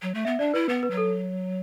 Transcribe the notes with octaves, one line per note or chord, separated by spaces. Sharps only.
F#3
A3
B3 E5
D4 D5
E4 B4
B3 B4
B4
F#3
A4